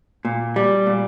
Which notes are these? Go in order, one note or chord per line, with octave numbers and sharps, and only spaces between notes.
A#2
G3
A#2